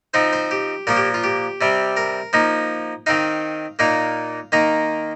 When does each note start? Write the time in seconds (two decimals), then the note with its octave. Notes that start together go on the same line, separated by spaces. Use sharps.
0.14 F3 C4 D#4 C5
0.33 C5
0.51 G4
0.87 A#2 F3 A#3 A#4
0.96 G4
1.14 F4
1.24 G4
1.61 C3 G3 C4
1.97 A#4
2.33 F3 A#3 D#4
3.06 D#3 C4 D#4 F5
3.79 A#2 A#3 D#4 F5
4.52 D#3 A#3 D#4 A#5